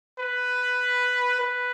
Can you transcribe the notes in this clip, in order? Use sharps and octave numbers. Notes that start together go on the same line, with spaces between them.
B4
B4